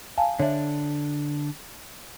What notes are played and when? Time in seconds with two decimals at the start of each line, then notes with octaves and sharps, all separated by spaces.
0.18 F5 G#5 A5
0.39 D3 D4 C#5 E5